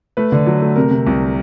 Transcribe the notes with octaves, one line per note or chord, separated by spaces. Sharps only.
A3 B4
D3
F#3
A3
C3 A#4
C3
C2